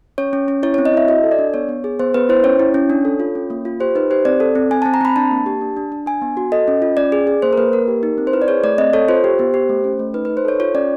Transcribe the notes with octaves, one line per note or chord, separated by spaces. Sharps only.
C#4 C#5
C#4
C#4
E4 C#5
C4 C#5
D#5
E4 E5
F#4 D#5
A4
D5
D4
B3 C#5
B3
G#4
B3 C5
B3 B4
E4 C5
C#4 C#5
E4
C#4
D4
A4
F4
C#4
A#3
F4
G4 C5
D#4 B4
G4 C5
C4 D5
A4
C4
C4 G#5
C4 A5
A#5
C4 B5
D4 A5
A#3
G4
D4
D4
D4
D4 G#5
B3
F#4
A4 D#5
C#4
F4
C#4 D5
G#4
G#4
A#3 C5
A#4
A#3 B4
A#3 A#4
G4
D#4
C4
C5
E4 B4
D5
G#4 C#5
A3 D5
C4 D#5
A4 C#5
F4 C5
G4
B3
G4
A3
C#4
A3
D#4 B4
D#4 B4
C5
A4 C#5
F4 C#5
C#4 D5